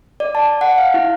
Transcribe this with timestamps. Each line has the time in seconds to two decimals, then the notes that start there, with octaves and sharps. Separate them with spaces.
0.20 D5
0.35 A5
0.61 F#5
0.78 F5
0.94 E4